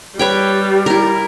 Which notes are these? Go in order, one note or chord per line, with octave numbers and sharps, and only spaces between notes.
G3 B4 C#5 G5
E4 A#4